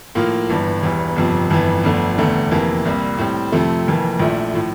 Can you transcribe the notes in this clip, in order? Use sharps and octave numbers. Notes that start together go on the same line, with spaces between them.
A2 F3 A#3 F4
G1 G2 E3
E1 E2 E3 G3
G1 F2 C3 F3
G1 F2 E3
G1 F2 D3 A3
F1 E2 D3 A3
F2 C3 E3 A#3
C2 C3 G3 A#3
A2 G3 C4
F2 C3 F3 A3
F1 F2 E3 A#3
A#1 A#2 A3 E4
A2 F3